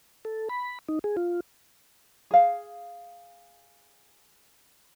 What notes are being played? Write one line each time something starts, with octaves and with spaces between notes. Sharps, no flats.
A4
B5
D#4
G#4
F4
G#4 F5